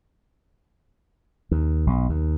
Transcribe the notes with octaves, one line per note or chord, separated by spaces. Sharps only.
D#2
B1
D#2